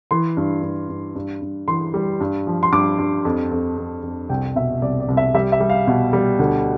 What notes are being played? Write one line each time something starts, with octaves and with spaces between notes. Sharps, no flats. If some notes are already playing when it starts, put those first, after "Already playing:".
E3 C6
G2
G2
G2
G2
G2
E3 C6
G3
G2
F3
C6
G2 D6
G2
F2
F2
F2
F2
C2 G5
B2 E5
C2 D5
D5
C2
E5
G3 E5
E5
G3
F5
B2
G3
D2